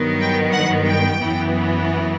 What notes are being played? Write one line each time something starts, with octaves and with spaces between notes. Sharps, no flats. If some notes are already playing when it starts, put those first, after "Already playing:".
Already playing: G2 D#3 F#3 B3
G5
F#5
G5
F#2 E3 B3